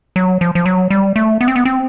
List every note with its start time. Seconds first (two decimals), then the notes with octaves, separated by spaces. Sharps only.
0.16 F#3
0.41 F3
0.55 F3
0.66 F#3
0.90 G3
1.16 A3
1.41 B3
1.48 C4
1.56 B3
1.65 C4